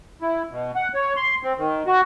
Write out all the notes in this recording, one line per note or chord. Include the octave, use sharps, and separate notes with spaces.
E4
B2
F#5
C#5
C6
C4
D#3
F#4